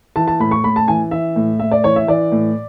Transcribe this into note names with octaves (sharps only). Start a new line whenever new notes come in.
E3 A5
A5
A2 B5
C#6
A2 B5
A5
E3 G#5
E3 E5
A2
A2 E5
D5
E3 C#5
E5
E3 D5
A2